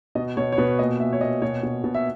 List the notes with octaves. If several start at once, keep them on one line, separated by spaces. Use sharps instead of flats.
B2 D#5
B2 C#5
C#5
B2 B4
A#2 D#5
A#2 E5
C#5
A#2 D#5
B2 C#5
B2
B2
E5